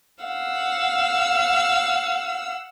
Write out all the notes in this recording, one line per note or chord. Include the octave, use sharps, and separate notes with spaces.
F5 F#5 E6